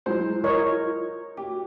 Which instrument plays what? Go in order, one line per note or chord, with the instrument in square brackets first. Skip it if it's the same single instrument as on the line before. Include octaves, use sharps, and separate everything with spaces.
[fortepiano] F#3 G#3 C5 [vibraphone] E4 F4
[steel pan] A#4 C#5 D#5
[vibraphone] F#4 D6 [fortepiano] G4